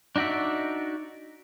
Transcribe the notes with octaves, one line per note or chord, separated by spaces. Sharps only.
D4 D#4 F#4 D5 E5